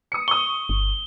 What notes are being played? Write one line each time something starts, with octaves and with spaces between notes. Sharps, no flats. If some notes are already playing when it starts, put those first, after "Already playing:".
D#6 C#7
C#6 D#6 G7
G1